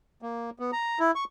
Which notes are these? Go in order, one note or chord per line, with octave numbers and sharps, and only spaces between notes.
A#3
B3
A#5
E4
C#6